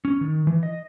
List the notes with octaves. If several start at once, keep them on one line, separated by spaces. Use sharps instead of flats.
C#4
D#3
E3
D#5